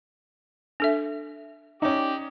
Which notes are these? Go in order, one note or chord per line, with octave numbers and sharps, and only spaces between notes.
D4 A4 E5
C#4 D#4 G4 D5